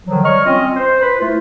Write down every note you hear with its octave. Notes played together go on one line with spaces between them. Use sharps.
D3 D#3 F3 F#3
G3 C#5 D#5 C#6 F6
C4 C#4 F4 D#5
C5
B4
A3 E4 F4